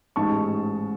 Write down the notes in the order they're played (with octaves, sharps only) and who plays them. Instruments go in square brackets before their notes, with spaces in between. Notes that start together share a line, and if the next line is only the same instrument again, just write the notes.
[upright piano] A1 G#2 G#3 A5 C#6